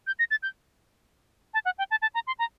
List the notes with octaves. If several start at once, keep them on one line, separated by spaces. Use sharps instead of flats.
G6
A#6
A6
G6
A5
F#5
G5
A5
A5
A#5
C6
A#5